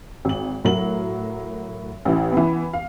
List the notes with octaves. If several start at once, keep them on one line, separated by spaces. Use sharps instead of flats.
G#1 F#7
A2 F#3 F#4 A#4 F#7
A1 E3
E3 B3
F5